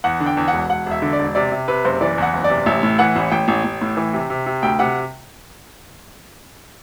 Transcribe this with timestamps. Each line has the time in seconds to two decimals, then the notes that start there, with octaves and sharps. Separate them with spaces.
0.04 E2 F#5
0.20 D3
0.26 G5
0.37 E2
0.48 F#5
0.53 E1
0.70 E1 F#5
0.86 E1
0.91 E5
1.02 D3
1.13 D5
1.19 E1
1.35 C3 D5
1.52 C3
1.68 C3 B4
1.85 F#1 C5
2.01 E3 D5
2.18 E2 F#5
2.33 F#1
2.44 D5
2.50 C3
2.66 A1 E5
2.83 A2
2.99 E3 F#5
3.16 A1
3.32 A1 G5
3.48 A1
3.64 A1
3.82 A2
3.97 E3
4.13 C3
4.30 C3
4.46 C3
4.63 D2 G5
4.79 C3 F#5